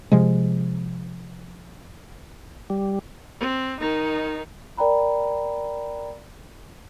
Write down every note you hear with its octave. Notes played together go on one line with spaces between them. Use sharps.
C3 F3 G#3
G3
C4
D#3 D#4
A#4 D5 G5 A#5 B5